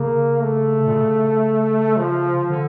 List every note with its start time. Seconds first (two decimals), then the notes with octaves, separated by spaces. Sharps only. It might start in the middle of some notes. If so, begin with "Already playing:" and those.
Already playing: C#3 A#3
0.41 A3
0.87 A#2
0.93 C#3
1.97 F3
2.50 D3